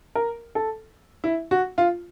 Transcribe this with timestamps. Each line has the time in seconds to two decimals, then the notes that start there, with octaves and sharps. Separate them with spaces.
0.15 A#4
0.55 A4
1.24 E4
1.51 F#4
1.78 F4